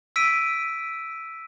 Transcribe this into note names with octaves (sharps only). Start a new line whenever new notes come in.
E6 B6 D7 D#7